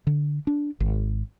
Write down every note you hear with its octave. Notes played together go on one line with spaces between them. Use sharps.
D3
D4
G#1